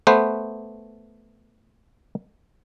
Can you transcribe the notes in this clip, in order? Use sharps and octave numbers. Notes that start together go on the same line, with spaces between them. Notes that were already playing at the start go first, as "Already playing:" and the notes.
A3 B3 B4 C5